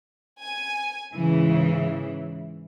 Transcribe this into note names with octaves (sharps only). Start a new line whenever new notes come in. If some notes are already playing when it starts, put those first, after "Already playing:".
G#5
G#2 C#3 E3